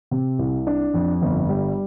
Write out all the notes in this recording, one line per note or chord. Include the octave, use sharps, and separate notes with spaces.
C3
C2
D4
F2
G1
G3